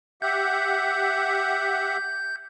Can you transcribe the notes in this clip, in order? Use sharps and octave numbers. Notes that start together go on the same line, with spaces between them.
G4 E5 F#5 G6